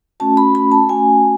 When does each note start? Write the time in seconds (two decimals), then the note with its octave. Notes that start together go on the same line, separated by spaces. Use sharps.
0.20 A3 C#4 F#4 A5
0.37 B5
0.55 B5
0.72 A5
0.89 A3 C#4 F#4 G#5